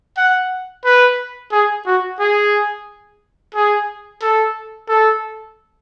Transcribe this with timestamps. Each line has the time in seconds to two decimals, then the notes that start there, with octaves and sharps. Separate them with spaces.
0.17 F#5
0.85 B4
1.52 G#4
1.86 F#4
2.20 G#4
3.55 G#4
4.22 A4
4.89 A4